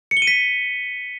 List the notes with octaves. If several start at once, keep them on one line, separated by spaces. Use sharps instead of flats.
C#7
G7
D#7
B6